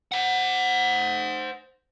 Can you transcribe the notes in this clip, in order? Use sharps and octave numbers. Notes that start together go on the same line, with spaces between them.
C5 F#5